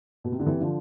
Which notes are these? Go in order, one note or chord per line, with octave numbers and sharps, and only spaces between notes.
B2
C3
D3
C3 E3
D3 F3